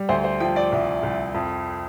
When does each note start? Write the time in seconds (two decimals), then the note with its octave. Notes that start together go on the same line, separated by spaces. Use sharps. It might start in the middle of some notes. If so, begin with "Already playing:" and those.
Already playing: G3
0.09 D2 C5
0.24 C5
0.40 F3 G5
0.56 D5
0.72 C2
1.03 C2
1.34 F2